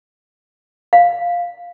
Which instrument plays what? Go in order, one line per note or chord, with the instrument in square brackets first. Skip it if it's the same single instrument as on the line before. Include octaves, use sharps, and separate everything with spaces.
[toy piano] F5